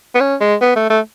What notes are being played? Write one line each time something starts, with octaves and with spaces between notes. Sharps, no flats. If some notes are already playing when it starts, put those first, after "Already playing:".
B3
C#4
G#3
B3
A3
A3